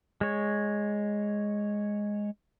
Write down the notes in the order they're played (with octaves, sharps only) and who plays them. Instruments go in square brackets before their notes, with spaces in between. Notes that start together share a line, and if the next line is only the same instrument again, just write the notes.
[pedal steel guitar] G#3 C#5